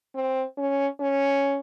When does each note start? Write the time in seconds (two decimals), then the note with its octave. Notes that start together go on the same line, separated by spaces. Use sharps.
0.15 C4
0.57 C#4
1.00 C#4